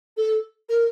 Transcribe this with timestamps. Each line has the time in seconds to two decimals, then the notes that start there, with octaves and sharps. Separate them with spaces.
0.17 A4
0.69 A#4